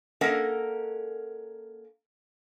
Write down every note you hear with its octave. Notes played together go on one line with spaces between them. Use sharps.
A#3 C#4 A4 A#4 D#5 F#5